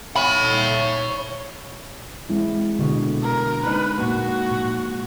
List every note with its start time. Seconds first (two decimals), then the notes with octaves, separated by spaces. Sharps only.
0.16 C#5 B5
2.30 G#3 C4 E4
2.79 B2 D3
3.22 A#4
3.64 G#3 C4 D#4 B4
3.98 A#2 A#3 F#4
4.51 A#2